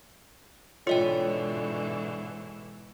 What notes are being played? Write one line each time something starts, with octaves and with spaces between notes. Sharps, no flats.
G#2 B2 D3 E3 F4 C#5 D#5 G5